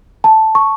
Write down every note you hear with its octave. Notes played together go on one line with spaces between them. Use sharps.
A5
C#6